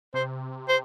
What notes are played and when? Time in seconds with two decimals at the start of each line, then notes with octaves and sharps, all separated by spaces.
0.14 C3 C5
0.68 C5